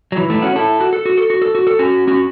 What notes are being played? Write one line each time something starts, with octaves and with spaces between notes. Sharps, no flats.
F#3
E3
E3 A3
C#4 F#4
E4 A4
F#4
A4
F#4
A4
F#4
A4
F#4
A4
C#4 F#4
C#4 F#4